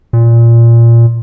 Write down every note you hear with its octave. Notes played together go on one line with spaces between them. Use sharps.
A#2